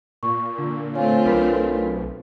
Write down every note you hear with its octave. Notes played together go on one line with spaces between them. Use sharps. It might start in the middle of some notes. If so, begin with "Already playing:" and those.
A#2 C#6
D3
A3 C4 F4 C#5 F5 G#5
B1 D4 A#4 B4